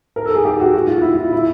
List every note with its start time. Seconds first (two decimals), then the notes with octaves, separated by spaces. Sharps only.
0.16 A#4
0.25 A4
0.35 G#4
0.45 G4
0.60 F#4
0.75 F#4
0.87 F4
1.01 E4
1.14 F4
1.33 E4